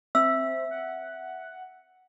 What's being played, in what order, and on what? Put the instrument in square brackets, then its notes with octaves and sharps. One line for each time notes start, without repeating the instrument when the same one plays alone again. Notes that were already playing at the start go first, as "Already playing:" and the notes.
[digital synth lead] C4 [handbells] E5 [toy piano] E6
[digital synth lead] F#5